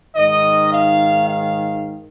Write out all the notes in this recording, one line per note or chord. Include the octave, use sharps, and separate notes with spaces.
G#2 D#3 D#5
F5
F5